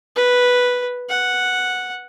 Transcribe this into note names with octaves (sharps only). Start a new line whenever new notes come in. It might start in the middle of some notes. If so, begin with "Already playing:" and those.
B4
F#5